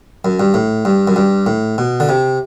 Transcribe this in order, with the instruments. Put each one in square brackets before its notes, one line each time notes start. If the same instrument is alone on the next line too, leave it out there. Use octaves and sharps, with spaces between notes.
[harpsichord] F#2
G2
A2
G2
F#2
G2
A2
B2
D3
C3